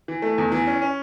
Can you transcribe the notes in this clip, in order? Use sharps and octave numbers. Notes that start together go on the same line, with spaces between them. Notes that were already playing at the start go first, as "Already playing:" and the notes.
E3
A3
E2
E3
C#4
C#4